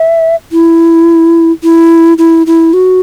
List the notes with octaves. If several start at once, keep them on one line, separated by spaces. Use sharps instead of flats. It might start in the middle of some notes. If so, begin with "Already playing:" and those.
Already playing: E5
E4
E4
E4
E4
F#4